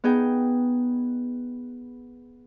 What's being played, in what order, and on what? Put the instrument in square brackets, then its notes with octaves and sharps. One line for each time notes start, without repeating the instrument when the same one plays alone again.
[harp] B3 D#4 G#4 G5